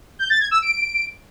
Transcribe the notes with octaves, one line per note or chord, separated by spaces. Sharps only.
G6
A6
G#6
E6
D7